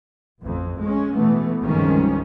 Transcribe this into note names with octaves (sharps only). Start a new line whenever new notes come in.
A1 F2
G#3 C#4
B2 E3 A3 B3
C2 G2 D#3 F3 G#3 C#4